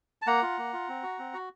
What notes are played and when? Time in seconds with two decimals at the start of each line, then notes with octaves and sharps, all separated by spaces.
0.22 A5
0.27 A#3 F#5 A#5
0.42 F4
0.58 A#3
0.73 F4
0.88 C4
1.03 F#4
1.19 C4
1.34 F#4